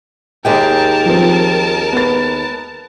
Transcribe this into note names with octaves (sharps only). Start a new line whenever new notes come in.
D#2 G#3 A#4 G5 A5
F3 C4
B3 A6